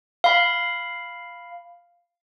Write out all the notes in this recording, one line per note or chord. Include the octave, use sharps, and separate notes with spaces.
F5 B5